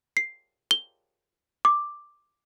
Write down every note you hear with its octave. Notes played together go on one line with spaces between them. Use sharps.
C7
G7
D6